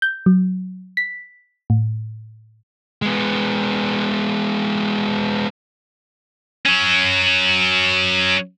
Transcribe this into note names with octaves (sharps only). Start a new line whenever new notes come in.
G6
F#3
B6
A2
G#3 B3
F#3 C#4